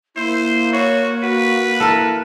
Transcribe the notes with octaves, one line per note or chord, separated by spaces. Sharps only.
A#3 E4 C5
F#4 C#5
F#4 B4
E4 A4 A#4